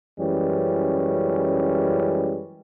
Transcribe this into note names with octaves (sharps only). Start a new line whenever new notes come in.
F#2 E3 G3 G#3 C#4